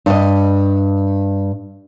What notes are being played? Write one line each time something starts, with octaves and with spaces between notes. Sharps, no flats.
G2 D#5